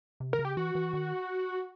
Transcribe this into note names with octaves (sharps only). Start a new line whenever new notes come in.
C3
D3 A#4
C#3
G4
E3 F#4
E3
D#3